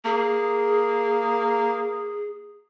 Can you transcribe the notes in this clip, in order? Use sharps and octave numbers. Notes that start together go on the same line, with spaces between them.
A#3 G#4